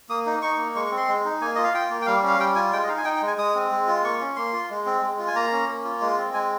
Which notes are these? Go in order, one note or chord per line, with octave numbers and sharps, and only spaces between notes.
A#3 D#6
D#4
D#4 C#6
A#3
G#3 C#6
C#6
C4
C6
G#3
D#4
A#3 G#5
F4 D#5
F5
F4 G5
A#3
G5
G3 F5
C#4 F5
G3 G5
F4 G#5
G#3 G5
D#5
D#4 F5
G#5
D#4 G5
G5
G#3
G#5
G#3 D#6
C4
G#3
F4
A#3 C#6
C#4
A#3 C6
F4
G#3
C4
G#3
F4
G#5
A#3 A#5
C#4
A#3
F4
G#3
C4
G#3 G#5